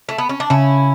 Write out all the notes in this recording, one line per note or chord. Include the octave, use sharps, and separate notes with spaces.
A3
B3
C#4
D4
C#3 C#4 E4